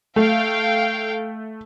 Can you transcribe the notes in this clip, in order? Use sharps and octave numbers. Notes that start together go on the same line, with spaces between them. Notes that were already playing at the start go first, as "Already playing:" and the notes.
A3 F5 G5